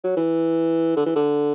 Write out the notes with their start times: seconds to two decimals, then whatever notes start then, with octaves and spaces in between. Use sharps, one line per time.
0.04 F#3
0.17 E3
0.97 D3
1.06 E3
1.16 D3